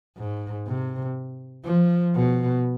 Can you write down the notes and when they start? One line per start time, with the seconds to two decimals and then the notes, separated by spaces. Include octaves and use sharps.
0.18 G#2
0.67 C3
1.66 F3
2.15 B2